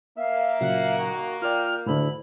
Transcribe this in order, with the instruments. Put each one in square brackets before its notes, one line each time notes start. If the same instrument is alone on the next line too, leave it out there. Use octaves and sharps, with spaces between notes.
[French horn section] A#3 [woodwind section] E5 F5
[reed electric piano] A#2 C#3 F#3 [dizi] F#5
[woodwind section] D#3 F#4
[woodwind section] A#2 G5 [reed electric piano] F4 D5 [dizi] F6
[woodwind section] D2 E4 [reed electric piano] A2 D3 [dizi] B5